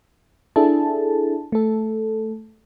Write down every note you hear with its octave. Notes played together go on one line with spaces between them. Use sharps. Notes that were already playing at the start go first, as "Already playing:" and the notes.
D4 E4 G#4 A4 A5
A3 A4